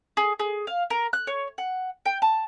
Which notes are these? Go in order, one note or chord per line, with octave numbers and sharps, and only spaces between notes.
G#4
G#4
F5
A#4
F#6
C#5
F#5
G5
A5